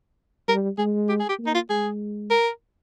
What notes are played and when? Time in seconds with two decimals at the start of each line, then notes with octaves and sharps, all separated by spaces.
0.48 G3 A#4
0.78 G#3 G#4
1.09 G4
1.19 G#4
1.29 G4
1.39 A#3
1.46 D#4
1.54 F4
1.70 G#3 G#4
2.30 A#4